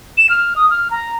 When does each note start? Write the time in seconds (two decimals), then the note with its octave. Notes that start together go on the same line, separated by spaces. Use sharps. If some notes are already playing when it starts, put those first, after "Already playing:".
0.18 E7
0.30 F6
0.56 D#6
0.70 F6
0.91 A#5